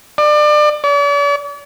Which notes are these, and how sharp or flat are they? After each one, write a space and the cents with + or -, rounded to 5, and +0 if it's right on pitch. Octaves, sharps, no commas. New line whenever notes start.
D5 +30
D5 -45